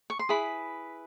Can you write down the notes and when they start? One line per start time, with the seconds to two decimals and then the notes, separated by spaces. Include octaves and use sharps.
0.10 C#6
0.19 C6
0.29 E4 G#4 B4 B5